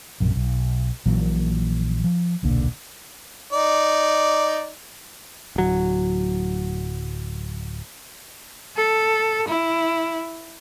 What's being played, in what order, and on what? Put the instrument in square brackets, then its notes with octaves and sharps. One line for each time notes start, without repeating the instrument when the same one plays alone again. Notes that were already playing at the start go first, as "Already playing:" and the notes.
[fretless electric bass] A#1 F#2 C3
B1
A#1 A#2 E3 F#3
F3
D#1 B1 D3 A#3
[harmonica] D#4 D5
[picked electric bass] D1 F#3
[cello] A4
E4